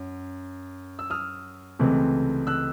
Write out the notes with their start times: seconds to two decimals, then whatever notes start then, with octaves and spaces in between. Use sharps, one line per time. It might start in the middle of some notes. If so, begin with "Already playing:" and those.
Already playing: F#2
0.99 E6
1.10 D#6 F6
1.79 C#2 C3 E3 A3 C4
2.47 E6 F#6